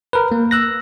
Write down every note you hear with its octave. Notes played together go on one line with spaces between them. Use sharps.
A#4 B4
A#3
E6 F#6 A#6